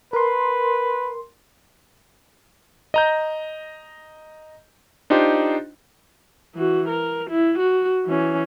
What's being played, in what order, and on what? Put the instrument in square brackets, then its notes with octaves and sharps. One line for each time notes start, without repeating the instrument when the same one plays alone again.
[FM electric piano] A#4 C6 [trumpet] B4
[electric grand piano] D#5 A#5 G6
D4 D#4 F4 G4 C5
[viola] E3 F#4
A#4
E4
F#4
E3 C#4